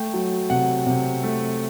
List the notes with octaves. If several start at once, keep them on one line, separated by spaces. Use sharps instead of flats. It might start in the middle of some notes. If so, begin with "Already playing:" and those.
Already playing: A3 G5
F#3
C3 F#5
C3
A3